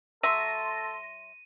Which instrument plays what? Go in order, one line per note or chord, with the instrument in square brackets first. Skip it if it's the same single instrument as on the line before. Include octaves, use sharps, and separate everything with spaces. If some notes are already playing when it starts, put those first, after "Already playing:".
[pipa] F#3 E5 [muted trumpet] A4 [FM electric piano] C6 A#6 [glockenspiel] D#7